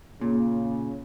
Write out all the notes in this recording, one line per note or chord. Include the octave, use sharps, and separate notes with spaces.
A#2 C#3